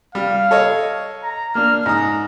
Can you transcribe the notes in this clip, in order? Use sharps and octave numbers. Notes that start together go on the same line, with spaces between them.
G3 F5
A4 C#5 D#5
A#5
A#3 D4 F6
G#2 A#5 D#6